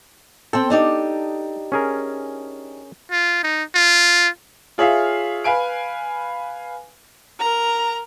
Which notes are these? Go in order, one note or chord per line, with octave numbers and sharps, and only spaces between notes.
C4 A4 C5 G5
D4 D#4 G4
C#4 G#4 A#4
F4
D#4
F4
F4 G#4 C#5 E5 F5
B4 F5 G#5 D7
A#4 A#5